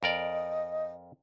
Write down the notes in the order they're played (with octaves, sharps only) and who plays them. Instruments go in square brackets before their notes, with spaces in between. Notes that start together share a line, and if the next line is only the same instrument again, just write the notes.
[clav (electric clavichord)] F2 A#4 D5 [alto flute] D#5